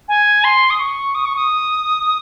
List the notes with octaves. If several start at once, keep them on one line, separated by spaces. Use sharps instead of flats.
G#5
C6
D#6
C#6
D#6
C#6
D#6